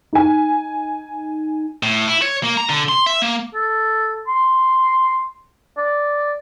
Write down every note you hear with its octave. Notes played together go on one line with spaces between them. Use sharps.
D#4 G#5
A2
E4
C#5
A#3
A#5
D3
C6
E5
A#3
A4
C6
D5